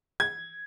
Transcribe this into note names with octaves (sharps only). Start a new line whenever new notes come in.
G#6